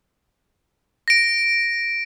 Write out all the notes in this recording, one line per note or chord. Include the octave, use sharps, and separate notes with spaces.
A#6 D7